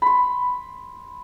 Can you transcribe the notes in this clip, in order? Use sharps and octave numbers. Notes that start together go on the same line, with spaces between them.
B5 C6